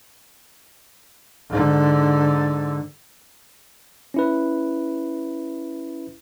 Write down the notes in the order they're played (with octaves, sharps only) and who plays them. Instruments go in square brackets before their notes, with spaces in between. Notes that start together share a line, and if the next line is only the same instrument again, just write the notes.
[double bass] G#2 D3
[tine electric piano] C#4 E4 B4